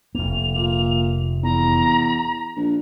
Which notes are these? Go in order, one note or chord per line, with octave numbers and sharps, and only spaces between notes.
F1 A#3 F7
A#2
E2 A#5
A#1